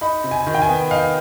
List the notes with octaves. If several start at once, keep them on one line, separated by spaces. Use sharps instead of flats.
D#4 B5
C3
G#5
D#3
G5
G#5
B3
D#4 F5